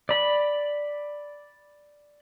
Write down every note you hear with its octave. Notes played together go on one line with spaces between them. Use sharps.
D5 B5